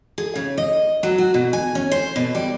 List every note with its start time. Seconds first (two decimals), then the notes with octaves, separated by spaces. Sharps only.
0.18 G#4
0.36 C#3
0.57 D#5
1.03 F#3
1.18 F#4
1.34 B2
1.53 G#5
1.75 C#4
1.92 C5
2.16 B2
2.35 G3